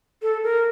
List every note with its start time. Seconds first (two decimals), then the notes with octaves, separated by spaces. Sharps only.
0.22 A4
0.44 A#4